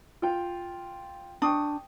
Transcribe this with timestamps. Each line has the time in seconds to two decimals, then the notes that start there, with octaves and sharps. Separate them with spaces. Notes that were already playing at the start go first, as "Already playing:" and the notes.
0.22 F4 G5
1.42 D4 G5 C#6 D#6